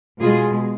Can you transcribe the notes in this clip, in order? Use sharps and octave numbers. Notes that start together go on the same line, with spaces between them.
B2 G#3 F4 G#4